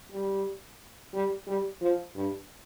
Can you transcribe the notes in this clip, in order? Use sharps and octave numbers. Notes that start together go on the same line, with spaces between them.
G3
G3
G3
F3
G2